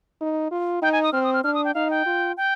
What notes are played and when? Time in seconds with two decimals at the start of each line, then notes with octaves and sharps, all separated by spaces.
0.21 D#4
0.51 F4
0.82 D#4 G5
0.92 G#5
1.03 D#6
1.13 C4 F6
1.24 D#6
1.33 F6
1.44 D4 F6
1.55 D#6
1.64 G5
1.74 D#4 F5
1.90 G5
2.06 F4
2.37 G5